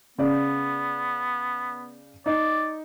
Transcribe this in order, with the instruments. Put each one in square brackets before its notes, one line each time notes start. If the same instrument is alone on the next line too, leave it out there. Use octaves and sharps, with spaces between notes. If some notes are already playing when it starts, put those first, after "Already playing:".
[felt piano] C#3 D5 [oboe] B3
[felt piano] D#4 [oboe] D5